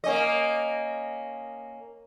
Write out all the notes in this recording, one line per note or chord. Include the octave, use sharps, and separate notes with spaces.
A#3 C#4 D#5